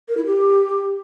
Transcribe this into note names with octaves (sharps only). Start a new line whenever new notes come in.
A#4
E4
G4